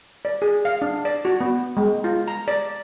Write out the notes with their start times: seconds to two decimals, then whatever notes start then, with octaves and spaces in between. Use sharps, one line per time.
0.25 D5
0.42 G#4
0.65 F5
0.82 D4
1.05 D5
1.25 F#4
1.41 B3
1.77 G#3
2.04 F4
2.28 A#5
2.48 D5